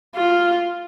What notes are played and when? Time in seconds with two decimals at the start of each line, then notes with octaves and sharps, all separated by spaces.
0.15 F4